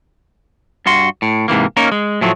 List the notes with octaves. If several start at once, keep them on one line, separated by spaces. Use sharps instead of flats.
G2 F#4 C6
A2
G#2 C3 E3 A#3
A#3 C#4 D#4 A#4
G#3
A2 F3 F#3 A3